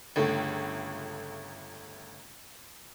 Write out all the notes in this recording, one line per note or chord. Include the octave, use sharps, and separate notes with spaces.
G1 C#2 A3